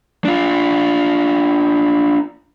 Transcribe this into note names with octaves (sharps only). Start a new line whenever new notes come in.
D4 F4